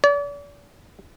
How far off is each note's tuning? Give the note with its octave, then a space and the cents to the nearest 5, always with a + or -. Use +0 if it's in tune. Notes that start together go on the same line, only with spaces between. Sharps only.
D5 -40